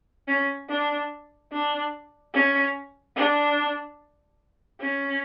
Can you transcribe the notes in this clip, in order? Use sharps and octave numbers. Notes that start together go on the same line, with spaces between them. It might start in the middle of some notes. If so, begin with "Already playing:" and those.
C#4
D4
D4
C#4
D4
C#4